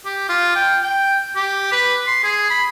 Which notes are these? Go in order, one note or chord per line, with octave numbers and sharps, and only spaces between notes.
G4
F4
G5
G5
G4
B4
C6
G#4
B5